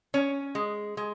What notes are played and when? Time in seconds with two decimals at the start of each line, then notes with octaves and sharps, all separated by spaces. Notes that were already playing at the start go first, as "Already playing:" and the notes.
0.14 C#4
0.55 G#3
0.97 G#3